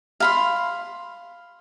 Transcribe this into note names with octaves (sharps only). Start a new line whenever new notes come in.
F5 B5 C6